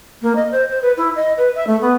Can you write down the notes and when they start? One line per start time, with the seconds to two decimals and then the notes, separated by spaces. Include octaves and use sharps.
0.22 A#3
0.36 D#5
0.52 C5
0.69 C5
0.82 B4
0.97 E4
1.16 D#5
1.37 B4
1.55 E5
1.67 A3
1.81 B3